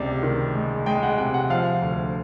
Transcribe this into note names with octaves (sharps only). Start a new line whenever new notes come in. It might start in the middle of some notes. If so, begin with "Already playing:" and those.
Already playing: C#2 C3 D5
D#3
G#3
G#3 G5
F#5
C3 G5
F#5
F3 F5
D2